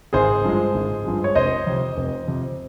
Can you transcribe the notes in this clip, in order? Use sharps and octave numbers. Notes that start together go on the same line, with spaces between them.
G#1 G#4 C5
G2 F3 G#3
G#1
G2 F3 G#3
C#5
F1 C5 D#5
F2 C3
F1
F2 C3